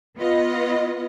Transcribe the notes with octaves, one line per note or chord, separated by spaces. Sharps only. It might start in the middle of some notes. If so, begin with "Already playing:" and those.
B3 F4 B4 D#5